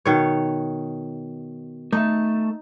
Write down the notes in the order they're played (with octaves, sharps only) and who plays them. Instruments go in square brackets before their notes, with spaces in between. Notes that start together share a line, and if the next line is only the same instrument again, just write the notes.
[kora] B2 D#3 C#5
[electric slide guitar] A3 E5 [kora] D#4